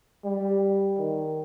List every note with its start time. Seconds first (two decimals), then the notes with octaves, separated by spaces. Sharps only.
0.24 G3
0.98 D#3